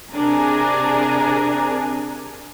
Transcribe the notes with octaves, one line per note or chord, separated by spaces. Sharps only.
C3 D4 G#4 A#4 G#5 A#5